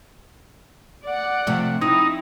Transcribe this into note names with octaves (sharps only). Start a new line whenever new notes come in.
D5 F#5
C3 F3 A3
C4 D#4 E4